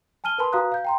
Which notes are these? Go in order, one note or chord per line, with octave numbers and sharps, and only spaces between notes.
G#5 A5 F6 D#7 G7
A#4 B4 G#5 A5 B5 C6
F#4 B4 F5 A#5 D#6 F#6
F5 G6
G5 A#5 C6